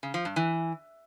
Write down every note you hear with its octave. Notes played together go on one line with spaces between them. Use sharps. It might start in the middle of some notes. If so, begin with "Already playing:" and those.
C#3
F3
G2
E3